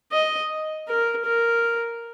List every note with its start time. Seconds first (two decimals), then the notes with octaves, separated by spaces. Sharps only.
0.12 D#5
0.88 A#4
1.26 A#4